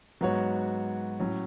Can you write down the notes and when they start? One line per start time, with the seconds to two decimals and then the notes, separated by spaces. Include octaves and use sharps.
0.21 G#2 F#3 B3 F#4 C#5
1.20 A2 F#3 C#4